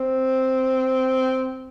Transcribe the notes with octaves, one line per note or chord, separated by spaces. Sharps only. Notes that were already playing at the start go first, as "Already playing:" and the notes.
Already playing: C4